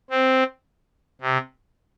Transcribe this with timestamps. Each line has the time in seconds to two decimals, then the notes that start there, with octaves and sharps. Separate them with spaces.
0.10 C4
1.21 C3